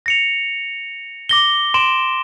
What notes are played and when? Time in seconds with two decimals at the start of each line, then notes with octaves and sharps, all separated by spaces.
0.06 A#6 C#7 F7
1.29 D6 A#6 G7
1.74 C6 D7 E7